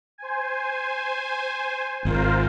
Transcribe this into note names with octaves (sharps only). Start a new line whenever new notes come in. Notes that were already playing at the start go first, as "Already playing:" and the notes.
C5 G#5
G#1 F4 A#4 C5